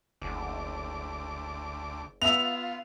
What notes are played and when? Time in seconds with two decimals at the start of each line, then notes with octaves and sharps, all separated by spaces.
0.22 F#1 D2 D6
2.22 B3 F4 E5 E6 F7